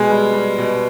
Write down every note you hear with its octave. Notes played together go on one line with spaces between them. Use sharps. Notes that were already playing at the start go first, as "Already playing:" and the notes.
Already playing: B2 G#3 G#4
G3
G3
B2